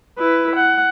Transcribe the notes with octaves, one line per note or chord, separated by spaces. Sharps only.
E4 B4
F#5